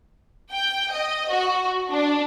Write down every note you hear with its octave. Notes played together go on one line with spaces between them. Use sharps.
G5
D#5
F#4
D4